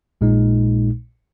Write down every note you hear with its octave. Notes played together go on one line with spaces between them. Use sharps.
A#1 A#2 G#3 D#4